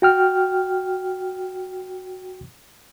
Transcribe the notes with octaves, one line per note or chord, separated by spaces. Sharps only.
F#4 G5 F6